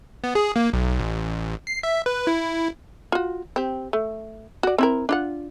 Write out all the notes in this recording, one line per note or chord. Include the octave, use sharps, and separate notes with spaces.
B3
G#4
A#3
B1
A1
C7
E5
B4
E4
F4 F#4
C4 G4
A3
F#4 D5
C4 E4 A#4
D4 F4 F#5